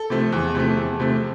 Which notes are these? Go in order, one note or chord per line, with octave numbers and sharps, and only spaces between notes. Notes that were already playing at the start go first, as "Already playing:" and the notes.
Already playing: A4
C3 F3 A3
E2
C3 F3 A3
E2
C3 F3 A3